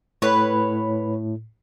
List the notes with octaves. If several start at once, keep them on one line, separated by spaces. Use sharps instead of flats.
A2 B4 C#5